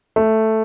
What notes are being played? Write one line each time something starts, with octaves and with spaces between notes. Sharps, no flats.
A3